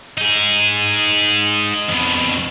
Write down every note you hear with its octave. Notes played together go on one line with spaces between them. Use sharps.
D#4 G#4
F2 B2